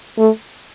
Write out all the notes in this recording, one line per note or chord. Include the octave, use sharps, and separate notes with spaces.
A3